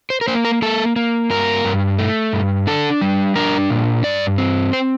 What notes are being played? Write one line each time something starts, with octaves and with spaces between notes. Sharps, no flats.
C5
A#4
A#3 C5
A#4
A#3 A4
A#3
G2 A#4
G2
A3
G2
D4 A4
G3
D4 A#4
A#2
G2 D5
C4
C5